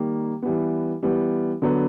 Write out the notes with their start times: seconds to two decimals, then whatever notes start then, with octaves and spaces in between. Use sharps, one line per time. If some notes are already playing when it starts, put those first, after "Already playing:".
Already playing: D#3 G3 A#3
0.42 E3 G3 B3
1.03 E3 G3 B3
1.62 D3 F#3 B3